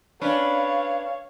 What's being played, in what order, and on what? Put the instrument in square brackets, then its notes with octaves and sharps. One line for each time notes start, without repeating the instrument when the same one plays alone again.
[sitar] C#4 D4 B4 [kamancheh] C#5 F5